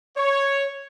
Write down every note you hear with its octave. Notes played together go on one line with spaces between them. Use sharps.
C#5